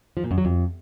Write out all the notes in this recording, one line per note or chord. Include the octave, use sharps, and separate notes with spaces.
F3
A#2
F#2
F#3
F2